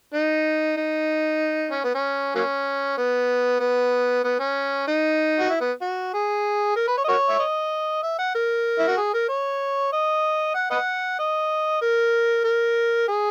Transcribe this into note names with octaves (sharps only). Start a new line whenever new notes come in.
D#4
D#4
C#4
B3
C#4
F#3 A#3 C#4
B3
B3
B3
C#4
D#4
F#4
E4
B3
F#4
G#4
A#4
B4
C#5
D#5
F#4 A#4 C#5
E5
D#5
E5
F#5
A#4
E4
F#4
G#4
A#4
C#5
D#5
F#5
B4 D#5 F#5
D#5
A#4
A#4
G#4